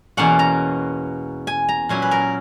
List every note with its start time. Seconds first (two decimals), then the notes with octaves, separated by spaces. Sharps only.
0.17 E2 B2 A#3 C#4 F#5
0.39 A#5
1.47 G#5
1.69 A#5
1.89 A#2 F#3 C#4 E4 G#5
2.02 B4
2.11 A#4